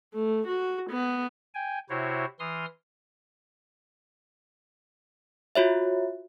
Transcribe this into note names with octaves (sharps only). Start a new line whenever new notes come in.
A3
F#4
B3
G5 G#5
C3 E4 F#4 C5 C#5
E3 C6 D#6 F6
F4 F#4 C#5 E5